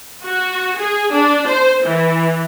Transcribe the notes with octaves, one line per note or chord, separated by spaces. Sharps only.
F#4
G#4
D4
C5
E3